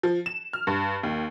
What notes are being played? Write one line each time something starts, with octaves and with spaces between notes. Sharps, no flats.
F3
E7
F6
G2
D#2